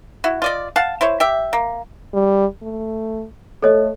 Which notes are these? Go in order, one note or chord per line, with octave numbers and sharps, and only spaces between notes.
E4 F#4
F4 D5 D#5
F5 F#5 A5
E4 C5 C#5
G4 E5
A#3
G3
A3
A3 A4 C#5 D#5